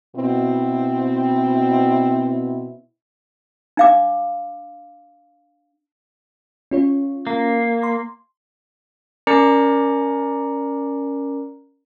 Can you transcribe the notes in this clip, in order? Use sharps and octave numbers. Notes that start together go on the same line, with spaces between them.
B2 C4 E4
D4 F5 D6
C#4 F4 C#5
A#3
C6
C#4 A#4 D5 A#5 D6 C#7